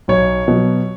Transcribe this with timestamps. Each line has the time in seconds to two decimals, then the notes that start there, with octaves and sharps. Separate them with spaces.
0.08 B1 C#5
0.48 B2 F#3